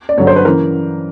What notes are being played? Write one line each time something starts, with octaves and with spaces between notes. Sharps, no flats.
D5
G2 D3 F#3 C#5
C5
B4
C#3 E3 A#4